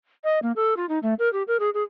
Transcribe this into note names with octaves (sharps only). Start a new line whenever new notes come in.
D#5
A#3
A4
F4
D#4
A3
A#4
G4
A#4
G#4
G#4